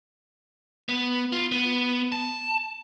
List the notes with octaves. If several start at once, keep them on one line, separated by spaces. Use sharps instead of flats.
B3
F4
B3
A5